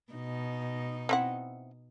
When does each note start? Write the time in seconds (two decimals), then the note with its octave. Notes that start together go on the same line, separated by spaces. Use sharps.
0.13 B2 D#4
1.09 C4 E4 F#5